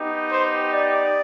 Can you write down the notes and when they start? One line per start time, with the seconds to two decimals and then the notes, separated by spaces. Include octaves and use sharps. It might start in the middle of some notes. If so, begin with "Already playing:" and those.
Already playing: B3 D#4 G4
0.31 C5
0.73 D5